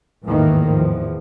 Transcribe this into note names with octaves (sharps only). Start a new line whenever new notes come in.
G#1 E2 A2 D#3 E3 A#3
E2 F3